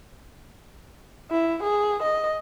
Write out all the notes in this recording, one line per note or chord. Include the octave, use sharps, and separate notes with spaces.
E4
G#4
D#5